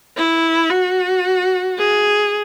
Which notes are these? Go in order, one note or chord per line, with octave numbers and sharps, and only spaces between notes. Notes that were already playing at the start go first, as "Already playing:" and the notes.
E4
F#4
G#4